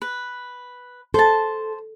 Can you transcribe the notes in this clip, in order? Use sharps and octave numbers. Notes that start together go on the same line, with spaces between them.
B4
A4 C5 A5